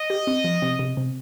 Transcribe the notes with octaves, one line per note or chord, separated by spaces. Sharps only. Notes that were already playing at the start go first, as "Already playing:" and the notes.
Already playing: D#5
G4
C4
F3
C3
C3
C3